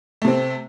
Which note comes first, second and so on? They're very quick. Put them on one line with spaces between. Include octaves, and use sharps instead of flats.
A3 C3 C4